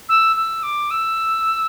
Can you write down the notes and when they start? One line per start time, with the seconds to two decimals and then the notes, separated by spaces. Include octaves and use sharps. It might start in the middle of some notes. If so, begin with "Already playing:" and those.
0.09 E6
0.36 E6
0.63 D6
0.91 E6